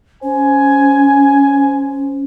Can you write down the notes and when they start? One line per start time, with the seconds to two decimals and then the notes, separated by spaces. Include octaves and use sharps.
0.23 C#4 C5 G#5